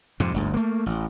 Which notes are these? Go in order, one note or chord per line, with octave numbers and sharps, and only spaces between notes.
F2 G#2 C3
G1 D2 G#2
A3 A#3
A1